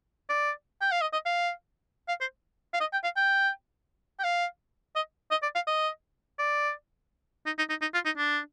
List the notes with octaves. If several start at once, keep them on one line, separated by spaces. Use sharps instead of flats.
D5
G5
F5
D#5
D#5
F5
F5
C5
F5
D#5
G5
F5
G5
G5
F5
D#5
D#5
D5
F5
D#5
D5
D#4
D#4
D#4
D#4
F4
D#4
D4